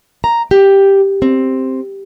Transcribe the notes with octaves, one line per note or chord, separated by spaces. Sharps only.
A#5
G4
C4